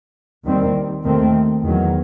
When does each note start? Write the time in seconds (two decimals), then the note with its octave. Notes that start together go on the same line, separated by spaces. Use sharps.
0.45 D#2 D#3 G3 C4
1.04 D#2 D#3 A3 C4
1.63 E2 D#3 F#3